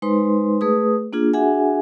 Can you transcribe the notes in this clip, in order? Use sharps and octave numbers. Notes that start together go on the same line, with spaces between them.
G#3 D#4 B4 C5 C6
A3 G#4 B4 D#6
A#3 D4 F4 G#4
D4 F#4 G#4 E5 F#5 G#5